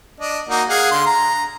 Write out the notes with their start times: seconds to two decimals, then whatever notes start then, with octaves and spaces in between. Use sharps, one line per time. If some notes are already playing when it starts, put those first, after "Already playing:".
0.20 D4 D#5
0.49 A#3 D#4 F#4
0.69 G#4 F5 F#5
0.91 D3 C6
1.06 A#5